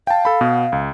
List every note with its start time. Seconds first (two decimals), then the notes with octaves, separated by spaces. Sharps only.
0.07 F5 G5 A5
0.25 A4 B5
0.41 B2 B3
0.72 C#2